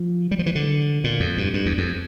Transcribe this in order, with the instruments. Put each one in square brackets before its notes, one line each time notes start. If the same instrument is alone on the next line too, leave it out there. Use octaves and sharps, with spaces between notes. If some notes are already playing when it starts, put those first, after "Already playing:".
Already playing: [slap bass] F3
G3
F3
E3
D3
A#2
F2
G2
G2
E2
F2